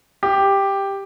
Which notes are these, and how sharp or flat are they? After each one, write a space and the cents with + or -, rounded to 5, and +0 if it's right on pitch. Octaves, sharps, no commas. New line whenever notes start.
G4 +5